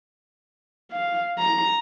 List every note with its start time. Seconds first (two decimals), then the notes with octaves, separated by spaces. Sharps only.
0.92 F5
1.38 A#5